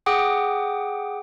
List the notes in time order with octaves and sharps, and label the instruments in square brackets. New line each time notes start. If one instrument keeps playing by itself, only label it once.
[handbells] G#4 F#5 G5 D6 D#6